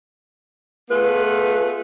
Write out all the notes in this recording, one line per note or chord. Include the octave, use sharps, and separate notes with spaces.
A3 B3 F4 G#4 B4